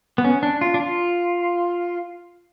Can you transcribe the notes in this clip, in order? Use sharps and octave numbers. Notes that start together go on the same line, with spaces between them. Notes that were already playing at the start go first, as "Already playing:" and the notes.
B3
C#4
D4
F4
D4
F4